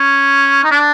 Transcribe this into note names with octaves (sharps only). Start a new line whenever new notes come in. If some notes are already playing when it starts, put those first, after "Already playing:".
Already playing: C#4
D#4
D4